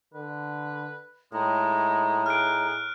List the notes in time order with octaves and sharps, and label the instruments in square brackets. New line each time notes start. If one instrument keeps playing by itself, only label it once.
[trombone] D3 [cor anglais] B4
[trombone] A2 [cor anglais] G#3 [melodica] D#4
[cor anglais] G#4 [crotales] F6 F#6 D7